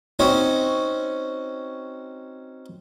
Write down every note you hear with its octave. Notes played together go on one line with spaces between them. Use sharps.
C4 C#4 D#4 F#4